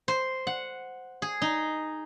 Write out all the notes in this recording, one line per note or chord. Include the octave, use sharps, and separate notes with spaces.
C5
F#5
G#4
D#4